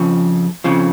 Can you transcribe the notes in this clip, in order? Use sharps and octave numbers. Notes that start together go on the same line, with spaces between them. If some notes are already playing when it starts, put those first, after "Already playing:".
Already playing: F2 C#3 F3
F2 C#3 F3